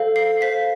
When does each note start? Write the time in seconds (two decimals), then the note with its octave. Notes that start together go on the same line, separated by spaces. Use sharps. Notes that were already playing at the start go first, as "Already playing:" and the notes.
Already playing: A4 C5 F5
0.16 C7
0.41 C5 F5 B6